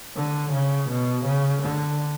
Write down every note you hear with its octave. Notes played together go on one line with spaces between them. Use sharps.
D3
C#3
B2
C#3
D3